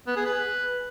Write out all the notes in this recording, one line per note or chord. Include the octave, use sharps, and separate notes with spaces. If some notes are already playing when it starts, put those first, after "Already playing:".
B3
G#4
B4